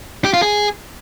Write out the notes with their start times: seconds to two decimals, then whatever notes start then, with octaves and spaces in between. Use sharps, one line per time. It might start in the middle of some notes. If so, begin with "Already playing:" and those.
0.25 G4
0.34 F4
0.43 G#4